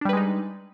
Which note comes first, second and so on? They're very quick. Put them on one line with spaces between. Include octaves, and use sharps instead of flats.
D4 G3 B4 G#3 D#4